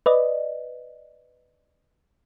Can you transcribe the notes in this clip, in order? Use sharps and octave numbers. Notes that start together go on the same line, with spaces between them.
B4 D5 D#5